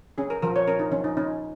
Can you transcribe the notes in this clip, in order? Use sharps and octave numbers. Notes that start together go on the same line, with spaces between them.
C#4 G#4
A#4
F3 A#4
C#5
C#4 A#4
D#4
F3 C#4
D#4
C#4 D#4